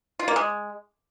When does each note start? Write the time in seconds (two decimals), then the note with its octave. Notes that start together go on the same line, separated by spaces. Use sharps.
0.19 F4
0.28 A#3
0.36 G#3